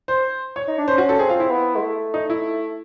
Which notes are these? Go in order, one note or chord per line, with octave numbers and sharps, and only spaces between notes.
C5
C#5
D#4
D4
C#4 C5
F#4
A4
C4 G#4
F4
E4
B3
G#3
A3
D#4
E4